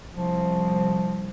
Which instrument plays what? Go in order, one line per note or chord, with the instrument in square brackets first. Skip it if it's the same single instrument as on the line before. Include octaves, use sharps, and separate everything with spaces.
[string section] C2 [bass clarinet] F3